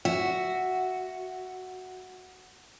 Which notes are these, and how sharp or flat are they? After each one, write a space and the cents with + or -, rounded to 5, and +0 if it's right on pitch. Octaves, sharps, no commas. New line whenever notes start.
F#4 +0 E5 +0